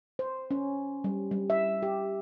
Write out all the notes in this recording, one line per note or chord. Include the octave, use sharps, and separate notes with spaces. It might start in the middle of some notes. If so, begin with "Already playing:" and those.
C5
C#4
G3
G3
E5
G4